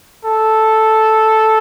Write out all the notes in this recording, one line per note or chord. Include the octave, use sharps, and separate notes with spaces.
A4